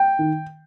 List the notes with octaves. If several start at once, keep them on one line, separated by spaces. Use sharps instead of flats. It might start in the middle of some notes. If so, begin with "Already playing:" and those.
Already playing: G5
D#3